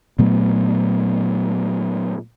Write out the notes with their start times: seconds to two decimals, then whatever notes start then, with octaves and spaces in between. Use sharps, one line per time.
0.19 A#2 F#3 A3 B3